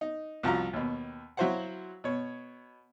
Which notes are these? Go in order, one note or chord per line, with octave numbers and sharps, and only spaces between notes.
D#4
C2 F3 F#4 F5 A#5
D#2 B2
F#3 E4 F#4 C5 F5 F#5
B2 C#5